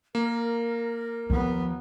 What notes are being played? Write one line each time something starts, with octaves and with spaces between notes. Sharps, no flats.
A#3 A#4
D#2 F3 B3